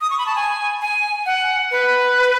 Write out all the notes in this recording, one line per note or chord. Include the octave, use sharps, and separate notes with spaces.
D#6
C#6
B5
A5
G#5
G#5
F#5
B4